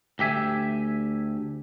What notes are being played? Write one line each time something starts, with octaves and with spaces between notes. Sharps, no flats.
D2 G4 E5 G#5